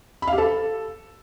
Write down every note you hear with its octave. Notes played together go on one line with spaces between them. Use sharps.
B5
F5
G4
A4